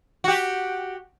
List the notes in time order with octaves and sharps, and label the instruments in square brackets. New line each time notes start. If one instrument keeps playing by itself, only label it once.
[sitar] F#4 G4